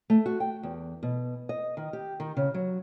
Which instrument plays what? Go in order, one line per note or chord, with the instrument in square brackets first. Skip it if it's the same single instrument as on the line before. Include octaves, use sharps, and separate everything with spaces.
[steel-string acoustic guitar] A3
F#4
G5
E2
B2
D#5
D#3
G4
D#3
C#3
F#3